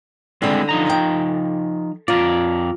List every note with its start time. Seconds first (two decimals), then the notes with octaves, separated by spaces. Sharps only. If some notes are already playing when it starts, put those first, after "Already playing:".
0.42 D3 G3 G#3 C4 E4
0.69 F3 D#4 A#5
0.90 G5
2.08 F2 F4 A#4 D5